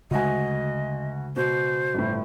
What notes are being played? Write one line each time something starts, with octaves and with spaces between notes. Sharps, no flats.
D2 C#3 G#3 F#4 D#5 G#5
B2 C5
G1 A2